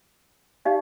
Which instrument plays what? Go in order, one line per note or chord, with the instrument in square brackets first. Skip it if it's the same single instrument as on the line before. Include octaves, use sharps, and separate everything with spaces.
[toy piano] D#4 G4 D5 F5